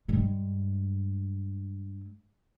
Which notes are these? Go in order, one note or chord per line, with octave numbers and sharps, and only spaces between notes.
G2 G#3